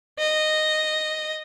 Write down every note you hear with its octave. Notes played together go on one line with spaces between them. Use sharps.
D#5